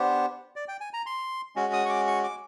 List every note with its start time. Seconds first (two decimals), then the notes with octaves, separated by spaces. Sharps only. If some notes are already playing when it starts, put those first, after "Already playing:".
Already playing: B3 D4 G4 C5
0.56 D5
0.68 G5
0.81 G#5
0.93 A#5
1.06 C6
1.56 G#3 C#4 F#4
1.73 D#6
1.85 C#6
1.89 D6
2.07 C#6
2.24 D6